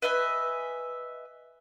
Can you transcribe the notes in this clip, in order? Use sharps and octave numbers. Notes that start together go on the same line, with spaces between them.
B4 D#5 E5 G#5